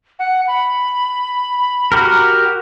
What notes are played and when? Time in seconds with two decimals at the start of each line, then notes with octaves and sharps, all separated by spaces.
0.19 F#5
0.48 B5
1.92 F#4 G4 A#4